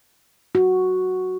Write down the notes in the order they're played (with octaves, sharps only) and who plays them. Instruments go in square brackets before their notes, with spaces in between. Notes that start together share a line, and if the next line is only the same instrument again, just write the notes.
[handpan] F#4